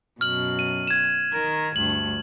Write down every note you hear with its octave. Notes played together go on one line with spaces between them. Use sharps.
F#2 B2 F6 F#7
D#7
G#6 E7
D#3 A#4
D2 G2 F#7